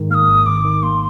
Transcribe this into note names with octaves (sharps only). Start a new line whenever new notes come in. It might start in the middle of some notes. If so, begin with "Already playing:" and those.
Already playing: G#2 D#3 G#3
A#3 D#6 F6
G#1
G#1 D6
D#3
A#3 C6